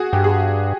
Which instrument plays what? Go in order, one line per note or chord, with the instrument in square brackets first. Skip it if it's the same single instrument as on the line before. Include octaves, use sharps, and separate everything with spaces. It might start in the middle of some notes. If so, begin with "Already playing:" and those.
Already playing: [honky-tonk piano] F#4 G#4
[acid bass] G2 [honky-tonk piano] G4
[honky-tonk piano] G#4